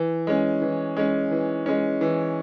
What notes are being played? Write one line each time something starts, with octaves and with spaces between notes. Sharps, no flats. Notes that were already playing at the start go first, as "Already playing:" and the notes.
Already playing: E3
G#3 C#4
E3
G#3 C#4
E3
G#3 C#4
E3